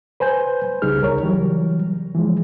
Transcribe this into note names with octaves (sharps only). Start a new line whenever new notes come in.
B4 C5 G#5 G6
C2 C#3 G3 D#4 G#4 F6
D2 A#4 C#5
C#3 E3 F#3 G3
E3 F3 G#3